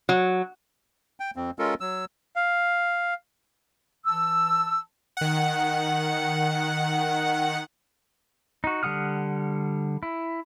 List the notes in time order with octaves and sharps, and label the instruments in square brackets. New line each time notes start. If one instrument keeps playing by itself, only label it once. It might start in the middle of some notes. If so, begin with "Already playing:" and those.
[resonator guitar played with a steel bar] F#3
[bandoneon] G5
F2 C4
G#3 C#4 F4 A4 A#4
F#3 E6
[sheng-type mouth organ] F5
[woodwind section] E3 A5 E6
[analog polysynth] D#3 F#5
[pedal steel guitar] D#4 F#4
D3 G3 F#5 D#6 F6
E4